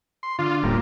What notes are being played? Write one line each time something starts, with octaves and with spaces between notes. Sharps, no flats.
C6
D3 F4
D#1 A2 G3 A#3